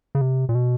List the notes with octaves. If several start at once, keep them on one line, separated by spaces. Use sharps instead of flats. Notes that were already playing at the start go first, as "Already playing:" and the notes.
C#3
C3
A#2
B2